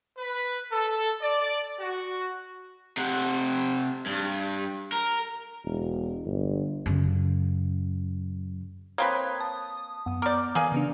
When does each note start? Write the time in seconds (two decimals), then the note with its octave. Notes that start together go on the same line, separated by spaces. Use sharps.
0.18 B4
0.71 A4
1.21 D5
1.79 F#4
2.97 C3 F#5
4.06 G2
4.92 A#4
5.65 E1
6.25 G1
6.86 F#2 C#3
8.98 A#3 C4 B4 C#5 D#6
9.41 A5 D#6
10.06 F#2 B3 D#6
10.22 A#4 D5 D6 F6 G6
10.55 E3 A#3 G#4
10.72 C#3 B3 D4